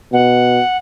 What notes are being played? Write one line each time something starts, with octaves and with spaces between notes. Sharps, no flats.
B2 F#5